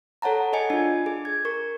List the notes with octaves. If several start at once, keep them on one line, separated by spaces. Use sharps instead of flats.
A4 C#5 F#5 A5 A#5
G#4 C#5 D#5 G#5 C#7
D4 F4
G#4
G#6
A#4 C#6